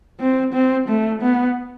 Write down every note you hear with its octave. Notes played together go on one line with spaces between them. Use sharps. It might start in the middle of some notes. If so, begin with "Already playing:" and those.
C4
C4
A3
B3